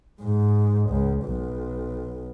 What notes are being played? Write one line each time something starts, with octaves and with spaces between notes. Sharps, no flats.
G#2
C#2
B1